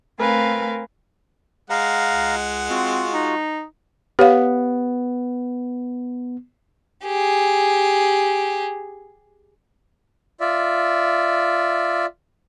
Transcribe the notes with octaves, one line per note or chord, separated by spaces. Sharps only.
A3 C4 A#4 B4 F5 G#5
G#3 F5 F#5 A#5
C#2
C4 F4 F#4
D#4
B3 G4 C#5 F5
G4 G#4
F4 D5 E5